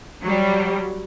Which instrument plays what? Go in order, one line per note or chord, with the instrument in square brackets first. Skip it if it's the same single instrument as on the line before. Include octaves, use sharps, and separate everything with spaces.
[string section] F#3 G3